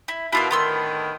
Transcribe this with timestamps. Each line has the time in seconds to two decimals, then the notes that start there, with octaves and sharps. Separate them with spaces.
0.08 E4
0.32 B2 E4 F4 A#4
0.51 A2 D3 D#3 B3 C6 E6